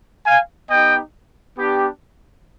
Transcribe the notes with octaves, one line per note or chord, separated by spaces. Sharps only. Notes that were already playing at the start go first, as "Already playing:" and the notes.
F5 G#5
B3 D#4 G4 D#5 G5
B3 D4 G4